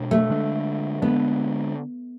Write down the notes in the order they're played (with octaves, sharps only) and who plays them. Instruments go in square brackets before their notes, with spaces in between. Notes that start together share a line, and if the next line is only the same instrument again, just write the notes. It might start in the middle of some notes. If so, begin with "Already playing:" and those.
Already playing: [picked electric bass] B2 G#3 D4
[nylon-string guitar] A3
[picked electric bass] D3 G#3 D4
[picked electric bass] D3 G#3 D4 [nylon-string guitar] B3